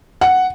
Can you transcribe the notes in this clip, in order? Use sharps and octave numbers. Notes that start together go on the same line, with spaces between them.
F#5